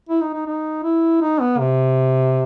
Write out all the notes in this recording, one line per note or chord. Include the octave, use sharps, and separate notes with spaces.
E4
D#4
D#4
D#4
E4
D#4
B3
C3